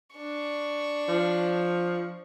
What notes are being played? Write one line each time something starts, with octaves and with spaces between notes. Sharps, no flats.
D4 C#6
F3